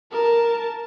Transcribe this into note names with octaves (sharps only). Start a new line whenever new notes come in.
A#4 A5